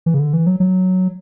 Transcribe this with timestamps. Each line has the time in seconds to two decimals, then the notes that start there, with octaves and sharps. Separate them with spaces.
0.06 E3
0.14 C#3
0.19 D3
0.33 E3
0.47 F#3
0.60 F#3